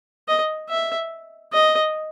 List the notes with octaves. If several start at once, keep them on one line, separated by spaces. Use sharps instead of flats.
D#5
E5
D#5